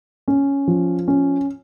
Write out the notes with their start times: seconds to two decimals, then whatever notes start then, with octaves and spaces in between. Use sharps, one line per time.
0.28 C#4
0.67 F3
1.08 C#4